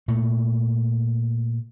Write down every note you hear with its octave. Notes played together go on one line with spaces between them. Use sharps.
A#2 A3